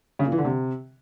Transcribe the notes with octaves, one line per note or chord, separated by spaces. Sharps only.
C#3
A#2
E3
D3
C3